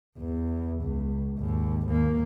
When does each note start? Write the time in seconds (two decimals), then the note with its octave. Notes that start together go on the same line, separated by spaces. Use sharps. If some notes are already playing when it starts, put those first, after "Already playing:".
0.18 E2
0.82 C#2
1.39 G#1 D#2
1.86 D#2 A#3